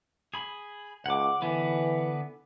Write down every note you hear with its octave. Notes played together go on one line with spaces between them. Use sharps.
G#4 B5
C#2 F#5 D6
D3 E3 B3 B4